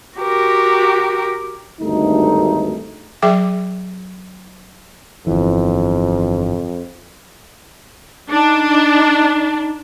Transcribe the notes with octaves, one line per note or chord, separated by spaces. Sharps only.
F#4 G4 A#4
G#1 D2 G2 D3 A3 D#4
F#3 G#4 E5 G5 D6
G1 F2 E3
D4 D#4